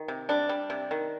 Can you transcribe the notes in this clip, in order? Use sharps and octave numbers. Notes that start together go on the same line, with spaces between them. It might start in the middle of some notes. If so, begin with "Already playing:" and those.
Already playing: D#3
C3
G3 D4
G3
C3
D#3